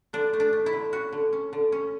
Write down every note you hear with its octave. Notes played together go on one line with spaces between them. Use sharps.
D3 D4
A3
D4
A3
E4
D3
C#4 F#4
D3
C#4
D3
C#4